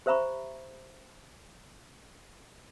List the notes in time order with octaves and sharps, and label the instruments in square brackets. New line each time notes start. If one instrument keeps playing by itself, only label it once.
[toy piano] G4 C5 E5 A#5 B5 C#6